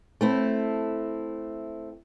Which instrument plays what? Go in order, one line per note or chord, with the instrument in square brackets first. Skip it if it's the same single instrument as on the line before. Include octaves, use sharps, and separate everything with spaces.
[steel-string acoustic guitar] A3 C4 E4